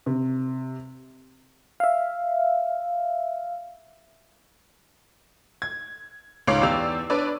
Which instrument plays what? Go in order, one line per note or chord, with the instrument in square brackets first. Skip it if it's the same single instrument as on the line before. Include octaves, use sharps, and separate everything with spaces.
[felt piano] C3
[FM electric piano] E5 F5
[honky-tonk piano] G#6
C#2 G#2 C#5 D6 C7
E2 G4 D5 E6 F7
D4 B4 C#5 D5